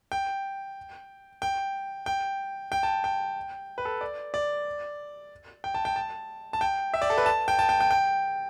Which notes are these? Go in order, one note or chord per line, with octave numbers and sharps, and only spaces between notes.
G5
G5
G5
G5
A5
G5
B4
A4
D5
D5
G5
A5
G5
A5
A5
G5
E5
D5
A4
B4
A5
G5
A5
G5
G5
G5